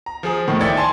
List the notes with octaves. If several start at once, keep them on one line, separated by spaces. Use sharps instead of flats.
A#5
F3 G#4
A2 D#3 F3
D5 E5 G5 G#6 A6 C#7
G#5 A5 C6